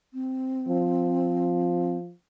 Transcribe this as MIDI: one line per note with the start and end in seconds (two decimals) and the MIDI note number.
0.14 1.97 60
0.68 2.12 53